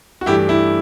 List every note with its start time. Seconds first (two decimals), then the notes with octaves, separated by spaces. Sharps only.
0.21 F#4
0.26 G2 E3 A3 E4 G4
0.49 E4